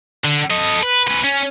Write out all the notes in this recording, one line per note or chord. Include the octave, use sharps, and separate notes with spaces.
D3
A4 D#5
B4
C#4 B4
C#4